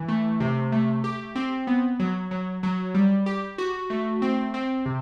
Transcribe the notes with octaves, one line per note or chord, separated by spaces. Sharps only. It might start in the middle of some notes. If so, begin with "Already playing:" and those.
Already playing: E3
A3
C3
A3
G4
C4
B3
F#3
F#3
F#3
G3
G4
F#4
A3
C4
C4
C3